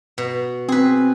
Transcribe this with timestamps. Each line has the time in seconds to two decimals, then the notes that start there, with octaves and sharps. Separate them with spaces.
0.18 B2
0.68 C4 G#4 B4